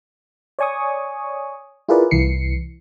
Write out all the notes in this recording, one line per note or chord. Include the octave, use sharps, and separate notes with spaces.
C#5 D5 G#5 C#6 D#6
E4 F4 G#4 A#4 B4 D5
C2 E3 C7 C#7